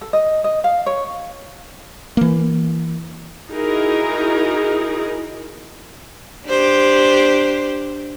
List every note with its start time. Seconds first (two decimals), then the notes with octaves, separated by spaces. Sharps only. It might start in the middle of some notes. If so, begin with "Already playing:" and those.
0.01 A4
0.13 D#5
0.44 D#5
0.64 F5
0.86 C#5
2.17 E3 A#3
3.50 D#4 E4 F#4 G#4 A#4
6.47 D4 G4 C5